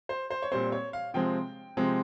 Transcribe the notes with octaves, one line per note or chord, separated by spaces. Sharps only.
C5
C5
C#5
A#2 G3 C4 C5
C#5
F5
C3 F3 G#3 C4 G5
C3 F3 G#3 C4